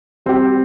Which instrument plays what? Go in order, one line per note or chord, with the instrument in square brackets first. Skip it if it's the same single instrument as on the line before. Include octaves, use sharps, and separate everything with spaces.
[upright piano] G3 C4 G4